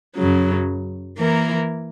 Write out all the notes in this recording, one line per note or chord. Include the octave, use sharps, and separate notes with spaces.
F#2 C#3 F#3
E3 A#3 E4 A#4